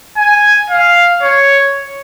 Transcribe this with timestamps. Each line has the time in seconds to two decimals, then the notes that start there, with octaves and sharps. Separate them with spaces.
0.17 G#5
0.70 F5
1.22 C#5